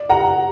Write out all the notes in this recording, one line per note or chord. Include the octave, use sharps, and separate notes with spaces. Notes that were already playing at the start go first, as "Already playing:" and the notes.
Already playing: D5
F#5 A#5